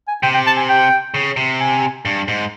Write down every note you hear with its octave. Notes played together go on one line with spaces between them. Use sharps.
G#5
C3 G5
G5
A5
G#5
G5
C#3
C3
G#5
G2
G#2